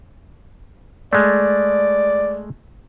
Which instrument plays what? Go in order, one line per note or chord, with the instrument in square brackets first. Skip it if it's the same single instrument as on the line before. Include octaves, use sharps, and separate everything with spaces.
[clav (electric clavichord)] G#3 A3 [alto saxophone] D5